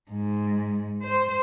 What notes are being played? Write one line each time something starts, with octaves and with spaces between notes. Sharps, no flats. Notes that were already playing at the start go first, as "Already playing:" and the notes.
G#2
C5